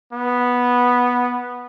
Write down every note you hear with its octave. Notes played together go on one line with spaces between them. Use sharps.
B3